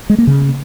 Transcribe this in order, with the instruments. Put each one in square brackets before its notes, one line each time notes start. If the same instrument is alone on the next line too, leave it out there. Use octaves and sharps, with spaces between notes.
[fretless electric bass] G#3
A#3
C#3